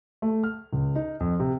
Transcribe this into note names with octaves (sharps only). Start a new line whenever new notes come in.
A3
F6
C#2
D#4
F2
C3